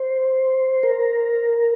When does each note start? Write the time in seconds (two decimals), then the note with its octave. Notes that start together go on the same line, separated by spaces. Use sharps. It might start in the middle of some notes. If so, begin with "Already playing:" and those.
Already playing: C5
0.83 A#4